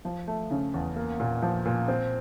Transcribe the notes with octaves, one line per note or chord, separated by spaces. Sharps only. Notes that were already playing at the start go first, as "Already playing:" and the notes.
F3
A3
C#3
E2
A#3
A#2
F3
A#2
C4